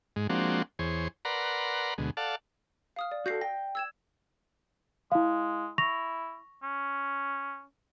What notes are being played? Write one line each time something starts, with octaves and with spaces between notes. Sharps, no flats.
G#2 G#3
F3 G#3 A#3 C4 D4 F#4
E2 G#4 C5 C#5
A#4 B4 D5 F#5 A#5 C6
D2 B2 G#3
A4 D5 F5 F#5 A5
F5 D#6 F6
D5
F#4 A4 G6 A#6 C7
G5 A#6
E6 G#6 E7
G#3 E4 F5
E4 C#6 A#6 F7
C#4